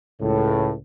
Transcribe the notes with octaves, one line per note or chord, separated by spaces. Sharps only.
C#2 A2